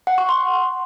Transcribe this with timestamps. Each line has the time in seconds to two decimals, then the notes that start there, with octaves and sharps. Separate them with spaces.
0.07 F#5
0.18 C#6
0.29 C6